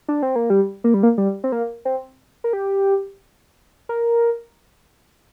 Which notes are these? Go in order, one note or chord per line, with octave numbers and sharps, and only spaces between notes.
D4
C4
A#3
G3
A#3
G3
A#3
G3
C4
A#3
C4
A#4
G4
A#4